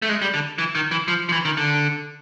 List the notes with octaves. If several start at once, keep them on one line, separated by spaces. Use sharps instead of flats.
A3
G#3
G3
D3
E3
D#3
E3
F3
F3
E3
D#3
D3